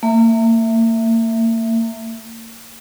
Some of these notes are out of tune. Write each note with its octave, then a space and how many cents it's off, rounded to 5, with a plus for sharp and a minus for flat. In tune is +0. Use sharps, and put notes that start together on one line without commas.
A#3 -35 E5 +0